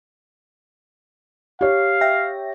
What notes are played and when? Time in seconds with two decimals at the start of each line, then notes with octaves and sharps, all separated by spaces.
1.61 G4 C#5 F5
2.01 E5 G5 A#6